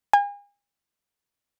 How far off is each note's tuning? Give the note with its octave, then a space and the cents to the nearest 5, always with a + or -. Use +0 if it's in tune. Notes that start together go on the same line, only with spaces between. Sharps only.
G#5 -40